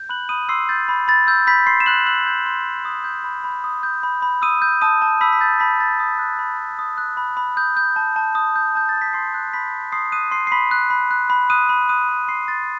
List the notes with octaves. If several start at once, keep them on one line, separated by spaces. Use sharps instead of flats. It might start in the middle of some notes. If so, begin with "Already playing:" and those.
Already playing: G6
B5 F#6 F#7
B5 D#6 D#7
C6 E6 C7
G6 A6
B5
B5 A6
E6 G6
B5 G6 B6
C6 C7
E7
C6 F#6 F#7
E6 F#6 F#7
G6
C6
C6
D#6
G6
B5
B5
D#6
G6
B5
B5
D#6 E6 D#7
G6
A5 D#6 D#7
A5
B5 E6 B6
B6
G6 A6
A5 B5 B6
A5 A6
D#6
F#6
B5
B5
D#6
F#6
B5
B5
D#6 G6
G6
A5
A5
D#6
G6
A5 G6
A6
A5
B6
C6 D#6 C7
F#6
B5 C6 B6
C6
C6 D#6 C7
D#6 F#6 D#7
C6 C7
C7
B5 C6 B6
F#6
B5
F#6
B5
D#6 F#6 D#7
B5
D#6 F#6 D#7
B5
C6 F#6 C7
C6 A6